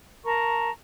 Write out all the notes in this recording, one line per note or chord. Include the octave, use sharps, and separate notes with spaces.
A#4 A5 A#5 C#6